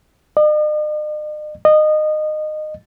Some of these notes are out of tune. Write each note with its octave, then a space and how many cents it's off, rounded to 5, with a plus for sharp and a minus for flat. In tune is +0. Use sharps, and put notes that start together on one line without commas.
D#5 -45
D#5 -20